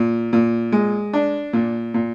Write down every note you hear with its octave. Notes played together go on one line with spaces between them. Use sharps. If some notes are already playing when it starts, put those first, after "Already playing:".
Already playing: A#2
A#2
G#3
D4
A#2
A#2